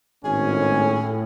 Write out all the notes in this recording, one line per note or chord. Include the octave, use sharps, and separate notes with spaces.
G#1 A2 C#4 G#4